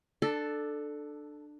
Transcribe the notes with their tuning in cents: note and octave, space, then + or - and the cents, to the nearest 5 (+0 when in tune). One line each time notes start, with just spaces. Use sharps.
D4 +20 A4 +0